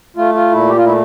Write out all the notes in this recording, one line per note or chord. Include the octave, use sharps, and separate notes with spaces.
A3 F4
F4
A#2 E4
G4
F4
A3 E4